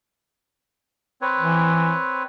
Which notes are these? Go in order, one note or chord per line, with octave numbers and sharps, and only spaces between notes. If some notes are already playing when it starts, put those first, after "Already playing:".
C4 B4 C#5
E3